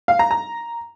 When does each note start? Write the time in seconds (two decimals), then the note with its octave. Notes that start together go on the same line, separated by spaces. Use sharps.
0.08 F5
0.19 A#5
0.31 A#5